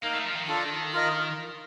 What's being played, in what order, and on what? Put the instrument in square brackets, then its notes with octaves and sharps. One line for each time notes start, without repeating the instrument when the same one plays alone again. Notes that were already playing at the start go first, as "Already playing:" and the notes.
[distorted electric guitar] A#3 [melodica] D#4 A#4 F5
[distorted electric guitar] A3
F3
D#3
[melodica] D4 F4 A4 D5
F4 A#4 D#5